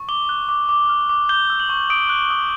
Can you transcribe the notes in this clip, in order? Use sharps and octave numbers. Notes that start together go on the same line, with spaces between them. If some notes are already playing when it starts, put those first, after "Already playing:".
Already playing: C#6
D6 G7
F#6
D6
D6
F6
D6
G6 G7
E6
F#7
C#6
D#6 D7
F#6
D#6